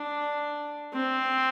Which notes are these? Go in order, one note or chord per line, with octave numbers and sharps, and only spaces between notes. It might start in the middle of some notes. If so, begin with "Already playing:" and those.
Already playing: D4
C4